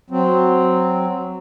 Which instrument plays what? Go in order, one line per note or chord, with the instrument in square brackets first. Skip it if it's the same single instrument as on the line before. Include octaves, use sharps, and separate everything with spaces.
[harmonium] F#3 C4